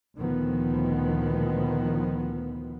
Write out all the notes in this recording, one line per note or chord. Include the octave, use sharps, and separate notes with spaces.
D2 A#2 D#3 F3 B3